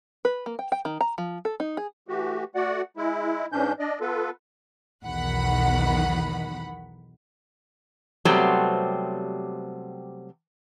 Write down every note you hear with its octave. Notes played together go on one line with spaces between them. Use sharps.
B4
A#3
G5
G5
D#3
A#5
F3
A4
D#4
G#4
E3 A3 F#4 G4
A3 F#4 D5 F#5
G#3 E4
G#2 E3 C#4 D4 G6
D4 D5 D#5
B3 F4 A4 B4
B1 E2 D#3 F#5 B5
C3 F#3 G3 A3 B3 C4